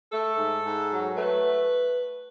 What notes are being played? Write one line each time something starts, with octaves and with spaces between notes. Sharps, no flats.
A3 A4
G#2
G#2
F#3
A3 B4